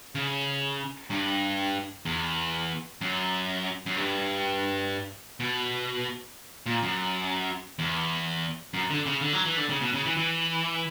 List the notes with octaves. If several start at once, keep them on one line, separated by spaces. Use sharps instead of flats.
C#3
G2
E2
F#2
F#2
G2
B2
A#2
F#2
E2
F#2
D3
C#3
D3
F#3
E3
D3
C#3
B2
C#3
E3
E3